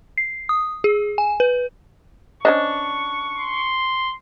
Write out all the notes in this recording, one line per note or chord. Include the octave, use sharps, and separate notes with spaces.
C7
D#6
G#4
G#5
B4
C#4 D4 C5 D#5 C#6
C6